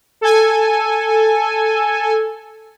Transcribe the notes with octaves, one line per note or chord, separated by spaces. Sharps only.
A4 G#5